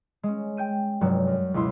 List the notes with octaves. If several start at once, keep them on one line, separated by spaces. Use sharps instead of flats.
G#3 C#4
G5 G6 D#7
F1 G2 F#3
F#2
C#2 B2 G#3 E4 C6 D6